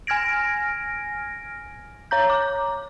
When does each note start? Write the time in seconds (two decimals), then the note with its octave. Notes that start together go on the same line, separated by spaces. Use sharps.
0.07 G#5 F6 G#6 A#6 D7
2.11 C#5 A#5 G6
2.30 D6